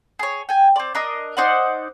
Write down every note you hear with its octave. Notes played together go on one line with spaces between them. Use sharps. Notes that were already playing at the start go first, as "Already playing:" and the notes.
G#4 C#5
G5 G#5
C4 D5
D4 A#4 D#5
D#4 C5 D5 F#5